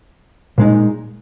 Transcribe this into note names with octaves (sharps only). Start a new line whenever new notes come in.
A#2 G#3 D#4